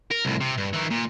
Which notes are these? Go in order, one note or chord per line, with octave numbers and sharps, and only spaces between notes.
A#4
C2 A2
C3
G2
D#3 E3
A#2